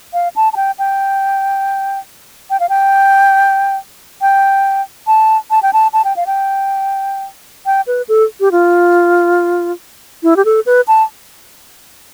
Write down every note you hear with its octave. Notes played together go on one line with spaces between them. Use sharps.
F5
A5
A5
G5
G5
G5
F5
G5
G5
A5
A5
G5
A5
A5
G5
F5
G5
G5
B4
A4
G4
F4
E4
G4
A4
B4
A5